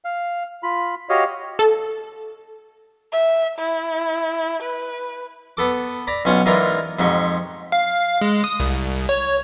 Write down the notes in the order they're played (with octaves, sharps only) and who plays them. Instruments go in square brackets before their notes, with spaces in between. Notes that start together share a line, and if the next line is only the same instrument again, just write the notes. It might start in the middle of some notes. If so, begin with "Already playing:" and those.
[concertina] F5
F4 B5
F#4 G4 C#5 D#5 F5
[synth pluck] A4
[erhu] E5
E4
B4
[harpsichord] B3 A4 D6
D5 A#5 B5
B1 C#4 F4 F#5
G#2 E3 F4 A#4 D5
F2 G#2 G4 C#6
[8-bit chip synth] F5
G#3
D#6
C2
C#5